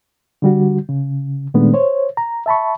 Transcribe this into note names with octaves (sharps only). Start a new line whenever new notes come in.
D3 G3 F#4
C#3
A#2 D#3 G#3 A3 B3 D4
C5 C#5
A#5
E5 A5 B5 C#6